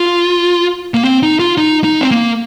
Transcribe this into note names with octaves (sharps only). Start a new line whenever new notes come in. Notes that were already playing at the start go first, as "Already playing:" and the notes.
Already playing: F4
A#3
C4
D#4
F4
D#4
D#4
C4
A#3